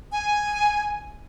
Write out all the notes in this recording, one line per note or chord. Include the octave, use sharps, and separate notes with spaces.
G#5